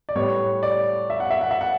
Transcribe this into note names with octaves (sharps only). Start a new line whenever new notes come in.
D5
A2 G3 B3 C#5
D5
E5
F#5
E5
F#5
E5
F#5